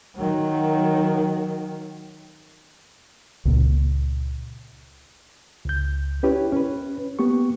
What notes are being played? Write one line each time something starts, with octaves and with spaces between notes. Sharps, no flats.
D#3 F#3
C#2 A#2
C#2 G6
C#4 E4 G4 B4 C#5
C#4 B4
A#3 B3 G4 C#6